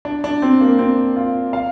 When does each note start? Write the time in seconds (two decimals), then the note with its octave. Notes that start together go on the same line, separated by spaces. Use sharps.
0.05 D4
0.24 D4
0.42 C4
0.61 A#3
0.79 C4
1.16 F4
1.53 F5